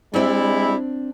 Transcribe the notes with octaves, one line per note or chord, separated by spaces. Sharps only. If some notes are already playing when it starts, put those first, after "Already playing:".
G3 G#3 C4 D4 E4